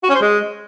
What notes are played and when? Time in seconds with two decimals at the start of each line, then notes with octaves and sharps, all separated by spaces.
0.03 F#4
0.09 C#4
0.15 C5
0.21 G#3